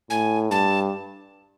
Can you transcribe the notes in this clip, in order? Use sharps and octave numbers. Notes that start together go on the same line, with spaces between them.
A2 G#5
G2 A5